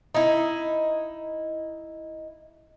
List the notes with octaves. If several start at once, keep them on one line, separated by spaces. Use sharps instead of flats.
D#4 E4